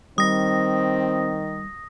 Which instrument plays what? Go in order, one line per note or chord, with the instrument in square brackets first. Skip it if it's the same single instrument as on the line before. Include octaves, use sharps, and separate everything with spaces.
[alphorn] D#3 [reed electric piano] G3 [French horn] C4 [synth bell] D#6 A#6